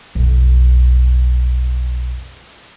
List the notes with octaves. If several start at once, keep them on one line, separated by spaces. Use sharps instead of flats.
B1 F2